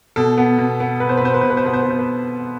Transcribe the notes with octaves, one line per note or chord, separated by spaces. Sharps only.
B2 A4
B3
B2
B3
B2 B4
C5
B4
B2 C5
B4
B2 C5
B4
C5
B2 B4
C5
B2 B4
C5
B4